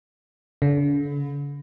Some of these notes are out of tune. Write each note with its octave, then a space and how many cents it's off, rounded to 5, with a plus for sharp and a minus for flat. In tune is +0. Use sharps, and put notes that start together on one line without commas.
D3 -40